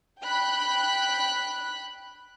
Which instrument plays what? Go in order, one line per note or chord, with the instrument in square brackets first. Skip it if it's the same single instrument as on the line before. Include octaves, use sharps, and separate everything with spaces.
[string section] G5 B5 F#6